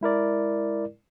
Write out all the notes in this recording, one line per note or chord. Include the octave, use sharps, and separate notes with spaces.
G#3 E4 A#4 D5